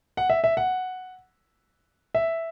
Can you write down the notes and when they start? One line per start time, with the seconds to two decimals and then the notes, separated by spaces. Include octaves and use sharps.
0.17 F#5
0.30 E5
0.44 E5
0.57 F#5
2.15 E5